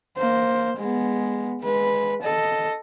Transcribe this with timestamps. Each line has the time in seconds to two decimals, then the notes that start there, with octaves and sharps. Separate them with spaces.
0.18 A#3 C5
0.78 G#3 B3
1.63 G#3 B4
2.22 A4 D#5